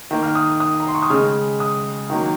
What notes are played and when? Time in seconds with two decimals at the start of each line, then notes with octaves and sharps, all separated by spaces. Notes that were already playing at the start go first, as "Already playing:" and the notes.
0.11 D#3 A#3
0.23 F6
0.35 D#6
0.60 D#6
0.80 A#5
0.87 C6
0.95 C#6
1.02 D#6
1.10 C#3 G#3 F6
1.60 D#6
2.10 D#3 F#3 A#3